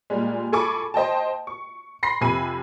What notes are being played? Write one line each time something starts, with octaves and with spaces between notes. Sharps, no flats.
A#2 G3 G#3
G#4 A4 G#5 B5 C#6 D6
C5 D#5 G5 A5
C#6
B5 C6 A#6 C7
F2 C3 G#5 B5 C7 D#7